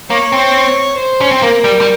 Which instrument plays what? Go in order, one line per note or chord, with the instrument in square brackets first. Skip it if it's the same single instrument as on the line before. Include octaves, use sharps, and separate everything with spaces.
[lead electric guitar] A#3 [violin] C#5
[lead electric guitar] C4
[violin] C5
[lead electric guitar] C#4
C4
[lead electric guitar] A#3 [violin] A#4
[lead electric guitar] G3
G3